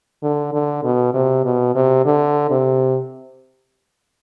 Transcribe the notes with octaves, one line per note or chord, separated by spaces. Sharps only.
D3
D3
B2
C3
B2
C3
D3
C3